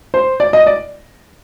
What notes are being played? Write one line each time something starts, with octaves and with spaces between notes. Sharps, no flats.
C5
D5
D#5
D5